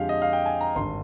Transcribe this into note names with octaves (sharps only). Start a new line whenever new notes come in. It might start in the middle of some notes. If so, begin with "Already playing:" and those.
Already playing: F2 D3 G#3 G4 F5
D#5
F5
G5
G#5
A#5
G#1 G2 D3 C6